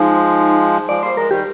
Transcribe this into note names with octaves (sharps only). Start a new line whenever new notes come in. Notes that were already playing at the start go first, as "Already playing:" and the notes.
Already playing: F3 G#3 D#4
F3 G#3 D5
G3 A#3 C5
F3 G#3 A#4
D#3 G3 G4